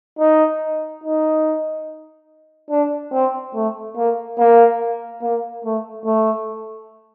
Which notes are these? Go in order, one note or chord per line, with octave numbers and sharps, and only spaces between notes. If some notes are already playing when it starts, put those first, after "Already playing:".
D#4
D#4
D4
C4
A3
A#3
A#3
A#3
A3
A3